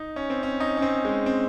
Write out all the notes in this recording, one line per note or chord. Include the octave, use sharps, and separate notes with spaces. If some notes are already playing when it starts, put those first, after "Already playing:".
Already playing: D#4
C#4
C4
C#4
D#4
C#4
C4
G#3
C4